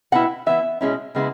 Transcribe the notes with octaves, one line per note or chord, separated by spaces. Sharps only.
B2 B3 E4 F#5
E3 B3 E4 E5
B2 G#3 C#4 E4
C#3 G#3 B3 E4